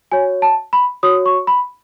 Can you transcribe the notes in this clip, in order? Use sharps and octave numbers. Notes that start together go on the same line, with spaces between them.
F#4 C#5 G#5
A5
B5
F#4 C#5 D#6
C#6
B5